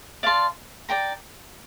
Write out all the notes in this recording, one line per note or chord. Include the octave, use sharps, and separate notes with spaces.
D5 F5 A5 C6
D5 G5 A#5